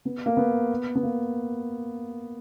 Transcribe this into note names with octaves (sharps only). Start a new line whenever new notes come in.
B3
A#3
B3
B3
A#3